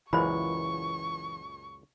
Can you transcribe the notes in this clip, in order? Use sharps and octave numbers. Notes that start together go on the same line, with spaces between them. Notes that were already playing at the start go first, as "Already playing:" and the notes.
C#2 F#2 A#2 E3 C5 B5 C#6